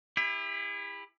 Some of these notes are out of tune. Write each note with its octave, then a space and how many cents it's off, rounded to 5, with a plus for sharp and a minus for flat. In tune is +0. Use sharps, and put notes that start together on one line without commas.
E4 +0 G4 +45